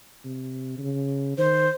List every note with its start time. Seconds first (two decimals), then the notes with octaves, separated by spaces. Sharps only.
0.24 C3
0.79 C#3
1.38 D#3 C5